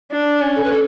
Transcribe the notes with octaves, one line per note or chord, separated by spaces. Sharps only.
D4
C#4
A4
B4
A4